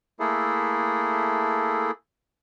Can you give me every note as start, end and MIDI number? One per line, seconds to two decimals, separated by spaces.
0.20 1.91 57
0.20 1.91 58
0.20 1.91 64
0.20 1.91 68
0.20 1.91 69